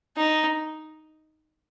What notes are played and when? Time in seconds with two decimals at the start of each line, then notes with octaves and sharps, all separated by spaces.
0.18 D#4